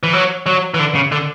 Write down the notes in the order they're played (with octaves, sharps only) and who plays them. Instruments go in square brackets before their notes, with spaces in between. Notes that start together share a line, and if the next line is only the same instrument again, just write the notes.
[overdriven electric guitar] E3
F#3
F#3
E3
D3
C#3
D3